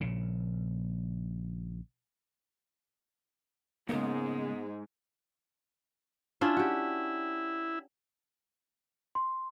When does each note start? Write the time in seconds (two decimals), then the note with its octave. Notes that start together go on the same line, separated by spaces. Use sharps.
0.01 A#1 C#3
3.89 C2 G#2 C#3 G#3 A#3 B3
6.41 C#4 D4 E4 F4
6.57 F#4 G4
9.15 C6